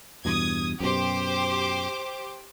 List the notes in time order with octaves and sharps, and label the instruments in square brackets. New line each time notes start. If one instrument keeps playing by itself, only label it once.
[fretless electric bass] E2 G2 B2 [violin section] D#6 G#6
[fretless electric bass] F#2 B2 [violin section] G4 C5 D6